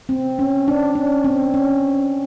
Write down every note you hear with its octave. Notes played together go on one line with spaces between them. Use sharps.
C4
C#4
D4
C#4
C4
C#4